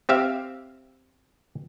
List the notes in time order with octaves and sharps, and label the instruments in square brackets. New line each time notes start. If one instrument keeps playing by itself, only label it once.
[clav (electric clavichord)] C4 G4 E5 F5